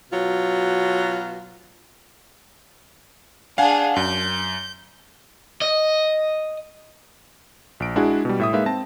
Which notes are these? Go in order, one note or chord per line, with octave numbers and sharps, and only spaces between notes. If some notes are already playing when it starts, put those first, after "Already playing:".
B2 F#3 F4
D4 G#4 F5 F#5 G#5
F#2 G6
D#5
A#1 D7
G#3 D4 E4 F#4 G#4
B2 G3
A2 E5 D#6
G#3 A#3 D#4 B4 E5 F5
C4 A5 A#6